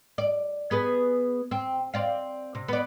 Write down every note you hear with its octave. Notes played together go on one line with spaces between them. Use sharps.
D5
B3 G#4 B4
C4
C4 D5 F5
C3
B3 D5